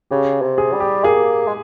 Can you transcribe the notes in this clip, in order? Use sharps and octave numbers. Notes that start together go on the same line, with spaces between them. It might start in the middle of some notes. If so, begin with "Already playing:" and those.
C#3 G4
C3
G#4
G3
G4
A#3 G#4
G#3